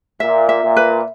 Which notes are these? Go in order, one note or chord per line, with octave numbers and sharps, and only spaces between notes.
A#2 E5
E5
A#2
B4